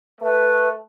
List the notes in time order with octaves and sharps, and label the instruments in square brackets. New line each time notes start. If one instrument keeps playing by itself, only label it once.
[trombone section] A3 [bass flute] B4